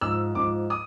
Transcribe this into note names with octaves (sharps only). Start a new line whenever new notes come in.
G#2 F3 E6
G#2 F3 D6
D#6